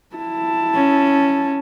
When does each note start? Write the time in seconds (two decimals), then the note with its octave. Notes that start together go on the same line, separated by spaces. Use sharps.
0.15 E4 A5
0.74 C#4